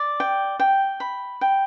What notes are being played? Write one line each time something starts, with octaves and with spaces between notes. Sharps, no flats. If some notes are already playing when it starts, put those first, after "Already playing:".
Already playing: D5
G5
G5
B5
G5